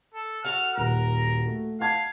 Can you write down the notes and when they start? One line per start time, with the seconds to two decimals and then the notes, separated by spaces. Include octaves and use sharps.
0.14 A4
0.44 F#4 A4 F#5 F6
0.78 D#1 A#4
1.47 A3
1.80 F5 F#5 A5 G#6